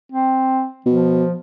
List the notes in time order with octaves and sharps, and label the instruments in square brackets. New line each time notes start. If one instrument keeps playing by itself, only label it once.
[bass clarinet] C4
[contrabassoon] B2 [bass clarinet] F3